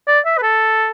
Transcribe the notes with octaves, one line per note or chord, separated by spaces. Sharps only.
D5
E5
B4
A4